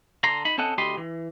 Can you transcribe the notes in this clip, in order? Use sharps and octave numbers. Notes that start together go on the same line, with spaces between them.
D3 A#5 C6
D#4 B5
C4 C#4 A4 D#5 F#5
D2 G4 D#5 B5 C6
E3